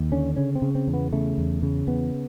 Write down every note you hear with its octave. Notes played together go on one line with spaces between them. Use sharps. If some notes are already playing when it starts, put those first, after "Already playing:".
Already playing: D#2
D3 C#4
C#3 C#4
C4
C#3
C4
E2
B3
C#3 A3
E2
C#3
E2 B3